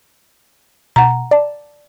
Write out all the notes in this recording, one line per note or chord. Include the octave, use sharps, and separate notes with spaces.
B2 F#5 A#5
D5 A5